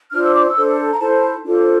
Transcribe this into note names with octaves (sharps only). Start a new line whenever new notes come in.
D4 F4 C5 F6
E6
D6
E6
D4 A4 C5
A#5
E4 A4 C5 A5
D4 F4 A4 C5